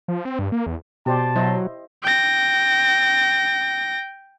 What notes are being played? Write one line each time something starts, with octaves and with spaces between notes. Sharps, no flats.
F3
C4
G2
A#3
E2
B2 G4 C5 D5 A5
F#3 E4 C5 D#5
G5 A#6